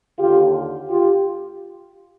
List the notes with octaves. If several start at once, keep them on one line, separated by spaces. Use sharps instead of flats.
D#2 D3 F4 G4
F4 G4